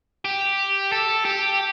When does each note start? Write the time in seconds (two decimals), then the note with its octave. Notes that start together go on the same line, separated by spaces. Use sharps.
0.25 G4
0.92 A4
1.25 G4